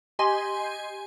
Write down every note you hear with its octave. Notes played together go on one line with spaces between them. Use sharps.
G4 D#5 G#5 C6